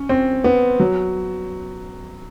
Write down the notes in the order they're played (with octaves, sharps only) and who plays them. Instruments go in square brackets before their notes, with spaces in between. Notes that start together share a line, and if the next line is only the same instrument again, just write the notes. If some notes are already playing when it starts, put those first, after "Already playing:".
Already playing: [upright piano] C#4
C4
B3
F#3